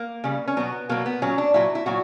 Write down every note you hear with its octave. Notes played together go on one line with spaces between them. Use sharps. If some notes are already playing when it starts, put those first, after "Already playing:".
Already playing: A#3
C#3 G3
C#4
B2 F#3 B3
B2 F#3 A#3
B3
A#2 F#3 C#4
D4
A#2 F#3 E4
E4
A#2 F#3 F#4